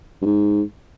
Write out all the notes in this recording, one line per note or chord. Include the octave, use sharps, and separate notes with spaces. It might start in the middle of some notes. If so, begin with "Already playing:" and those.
G2
G#2